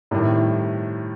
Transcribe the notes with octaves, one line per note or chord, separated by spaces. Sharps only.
A2 C3 D#3 G3